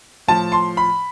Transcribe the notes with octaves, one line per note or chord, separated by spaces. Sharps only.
A2 F3 A5
C6
B5